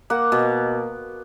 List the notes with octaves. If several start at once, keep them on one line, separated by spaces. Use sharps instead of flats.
A#3 F#5
B2